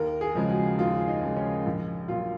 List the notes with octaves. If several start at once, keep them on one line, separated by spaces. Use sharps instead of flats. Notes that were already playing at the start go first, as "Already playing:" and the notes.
Already playing: D#2 A#4
G#4
C#3 F3 G#3
F#4
D#2 F4
D#4
C#3 F3 G#3
C#4
A#1
A#2 F#3 F4